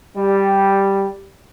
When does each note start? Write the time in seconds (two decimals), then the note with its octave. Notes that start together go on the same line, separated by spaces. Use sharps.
0.16 G3